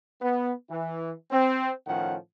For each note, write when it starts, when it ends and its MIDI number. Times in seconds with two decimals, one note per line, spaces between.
0.22 0.53 59
0.70 1.12 52
1.31 1.71 60
1.87 2.16 45
1.87 2.16 51
1.87 2.16 53
1.87 2.16 61
1.87 2.16 78